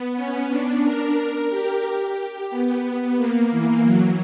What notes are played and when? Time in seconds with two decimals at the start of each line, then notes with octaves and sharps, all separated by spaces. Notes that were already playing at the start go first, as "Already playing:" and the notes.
Already playing: B3
0.16 C#4
0.49 D4
0.83 A#4
1.50 G4
1.84 G4
2.51 B3
3.17 A#3
3.51 E3
3.85 F#3